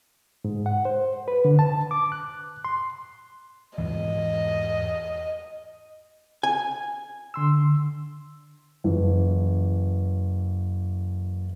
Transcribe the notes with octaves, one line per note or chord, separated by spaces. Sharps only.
G#2
F#5
C5
B4
D3
A5
D6
F#6
C6
E2 G#2 E3 D#5
G#5
D3 C6 E6
F#1 E3